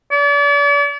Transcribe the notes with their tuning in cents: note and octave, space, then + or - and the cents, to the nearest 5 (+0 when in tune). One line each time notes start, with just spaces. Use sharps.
D5 -40